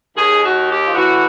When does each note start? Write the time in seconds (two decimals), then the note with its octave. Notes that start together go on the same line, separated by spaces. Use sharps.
0.16 D#2 D#3 G#4
0.42 F#4
0.68 G4
0.86 F4
0.94 A2 E3 F#4